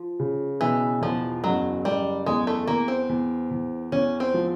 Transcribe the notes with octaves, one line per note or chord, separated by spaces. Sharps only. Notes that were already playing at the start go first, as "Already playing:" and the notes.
Already playing: F3
C#3
B2 E3
E2 F3
F#1 F#3
F#1 G3
E2 G#3
A3
E2 A#3
C4
E2
E2
E2 C#4
C4
F3